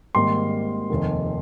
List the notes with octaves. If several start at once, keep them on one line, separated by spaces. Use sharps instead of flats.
G#1 G#2 G3 A#3 C6
F1 D#2 D#3